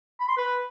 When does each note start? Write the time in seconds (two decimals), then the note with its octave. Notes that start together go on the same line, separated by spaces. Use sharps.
0.20 B5
0.28 C6
0.37 B4